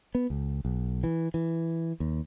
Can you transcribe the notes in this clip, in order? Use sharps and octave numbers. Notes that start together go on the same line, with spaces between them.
B3
C#2
B1
E3
E3
D#2